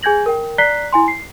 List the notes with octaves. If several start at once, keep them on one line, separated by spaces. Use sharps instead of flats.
G#4 G#5 G6 G#6 A#6 F#7
A#4 G5
D5 A#5 F#6 B6 C7 G7
E4 G#5 C6
C7